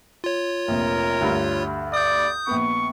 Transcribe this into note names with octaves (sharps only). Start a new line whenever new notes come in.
F4 C#5
F1 A#1 A#4
D2 G2
D5 D#6 G6
A#1 B3 C#6